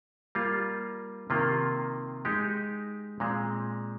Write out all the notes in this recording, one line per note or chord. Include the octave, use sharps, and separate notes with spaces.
G3 A#3 F4
C3 D#3 A#3 F4
G#3 D#4 G4
A#2 G#3 C4